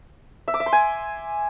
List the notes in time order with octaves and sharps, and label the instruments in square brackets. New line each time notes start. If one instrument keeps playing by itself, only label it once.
[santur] E5
D6
E5
C6
G#5